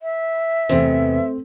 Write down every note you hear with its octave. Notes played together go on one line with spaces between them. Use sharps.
E5
E2 C3 A3 C4 C5